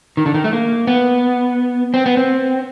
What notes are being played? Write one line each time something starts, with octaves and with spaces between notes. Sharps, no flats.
D#3
D3
D#3
A3
A#3
B3
C4
B3
C4